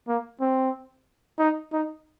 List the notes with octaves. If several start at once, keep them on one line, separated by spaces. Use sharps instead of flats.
A#3
C4
D#4
D#4